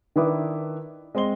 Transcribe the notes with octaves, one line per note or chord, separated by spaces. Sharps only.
D#3 D4 E4 B4 D6 D#6
G#3 C4 D#5 C6 G7